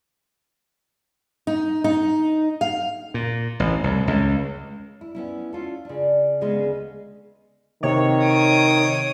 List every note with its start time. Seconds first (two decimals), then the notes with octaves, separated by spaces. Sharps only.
1.47 D#4
1.84 D#4
2.61 F5
3.14 A#2
3.60 A1
3.84 C2
4.07 C#2
5.01 E4
5.15 B3 C#4 E4
5.53 C#4 F4 A4
5.85 C#3 D4
6.41 D2 C#3 G#3 B3 B4 D#5
7.83 C3 D#3 C#5
8.25 D#6 D7